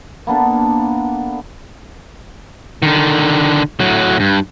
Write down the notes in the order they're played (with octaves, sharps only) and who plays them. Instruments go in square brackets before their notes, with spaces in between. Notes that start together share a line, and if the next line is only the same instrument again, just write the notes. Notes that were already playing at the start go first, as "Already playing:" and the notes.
[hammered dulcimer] A#3 B3 D4 A4
[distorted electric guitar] D3 D#3
A2 F#3
G2